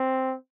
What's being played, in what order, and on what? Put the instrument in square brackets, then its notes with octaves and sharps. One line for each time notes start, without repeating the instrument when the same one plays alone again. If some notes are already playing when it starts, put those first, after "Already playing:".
Already playing: [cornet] C4